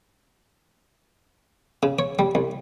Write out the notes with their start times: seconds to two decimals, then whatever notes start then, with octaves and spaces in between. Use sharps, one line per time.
1.83 C#3
1.99 C#5
2.19 G3
2.35 C2